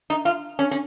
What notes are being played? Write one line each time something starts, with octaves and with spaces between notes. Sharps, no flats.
D#4
F4
C#4
C#4